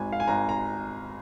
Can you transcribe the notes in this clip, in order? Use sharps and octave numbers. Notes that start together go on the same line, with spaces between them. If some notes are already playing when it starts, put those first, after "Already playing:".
Already playing: G#1 G#2 G#5
F5
G#5
G#1 A#5
A#5